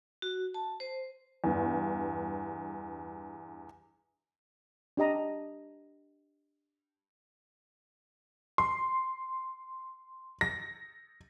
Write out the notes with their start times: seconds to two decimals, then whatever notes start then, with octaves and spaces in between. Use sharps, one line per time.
0.22 F#4
0.54 A5
0.80 C5
1.44 E2 G2
4.97 D4 G4 D#5 A#5
8.58 C6
10.41 A#6